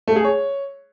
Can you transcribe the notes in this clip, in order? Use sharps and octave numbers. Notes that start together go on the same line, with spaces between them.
A3
G#4
C#5